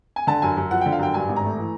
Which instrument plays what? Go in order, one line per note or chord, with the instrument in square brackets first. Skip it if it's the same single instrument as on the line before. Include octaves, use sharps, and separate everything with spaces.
[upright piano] G#5
D3 A5
F#2 G#5
F#2
F3 F#5
D3 G5
F5
F#2 G5
G2 G#5
G#1
A#5
A3
E3